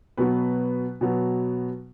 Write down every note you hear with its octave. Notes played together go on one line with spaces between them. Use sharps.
B2 F#3 B3 B4
B2 F#3 B3